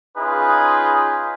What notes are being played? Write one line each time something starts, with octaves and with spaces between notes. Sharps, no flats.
C#4 D#4 F4 G#4 B4